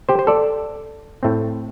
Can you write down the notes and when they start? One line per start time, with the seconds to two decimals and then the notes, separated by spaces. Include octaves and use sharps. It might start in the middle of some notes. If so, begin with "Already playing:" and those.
0.09 G4 C5
0.19 C5
0.27 A4 D5
1.23 A2 A3 C4